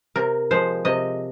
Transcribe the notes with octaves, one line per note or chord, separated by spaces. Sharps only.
C3 A#4
F3 G#3 C5
C3 D#5